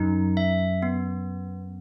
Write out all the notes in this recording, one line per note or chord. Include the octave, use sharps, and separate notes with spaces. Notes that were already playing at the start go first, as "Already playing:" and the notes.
Already playing: F#2 D#4
E5
B3